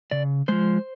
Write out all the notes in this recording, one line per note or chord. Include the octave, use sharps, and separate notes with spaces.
C#3 D5
F3 G#3 C5